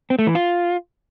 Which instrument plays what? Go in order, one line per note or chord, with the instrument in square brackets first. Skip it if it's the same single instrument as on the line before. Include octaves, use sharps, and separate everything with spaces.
[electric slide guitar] C4
A3
E3
F4